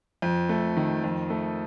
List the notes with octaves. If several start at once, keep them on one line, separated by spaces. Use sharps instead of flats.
F2
A3
D#3
F2
A3